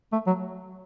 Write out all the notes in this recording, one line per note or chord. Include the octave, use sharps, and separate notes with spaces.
A3
F#3